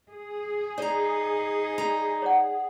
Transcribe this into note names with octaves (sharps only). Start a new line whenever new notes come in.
G#4
D#4 C5 D5 A#5
G3 A#5
C#5 D5 F#5